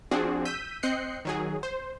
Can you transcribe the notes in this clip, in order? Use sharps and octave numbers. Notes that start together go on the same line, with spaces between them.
F3 C4 D4 F#4 G#4
E6 G6 B6 D#7
C4 D#5 F#6 G6 C7 C#7
D#3 F#3 G#4
C5